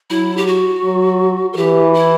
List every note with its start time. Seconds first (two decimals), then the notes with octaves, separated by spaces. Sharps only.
0.10 F#3 E4
0.37 G4
0.47 F#4
0.84 F#3
1.53 A#4
1.57 E3 G4
1.94 E4